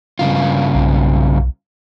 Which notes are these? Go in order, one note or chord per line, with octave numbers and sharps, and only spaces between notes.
G2 C#3 F4
B1